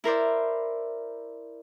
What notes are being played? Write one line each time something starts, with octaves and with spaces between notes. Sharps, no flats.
E4 A#4 C5 D5